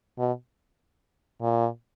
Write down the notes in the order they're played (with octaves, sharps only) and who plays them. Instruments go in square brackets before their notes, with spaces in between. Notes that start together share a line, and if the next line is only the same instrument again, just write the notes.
[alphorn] B2
A#2